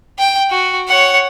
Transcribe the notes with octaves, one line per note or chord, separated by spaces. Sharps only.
G5
F#4
C#5 F#5